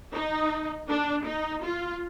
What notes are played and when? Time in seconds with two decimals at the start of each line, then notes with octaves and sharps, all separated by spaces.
0.12 D#4
0.88 D4
1.26 D#4
1.64 F4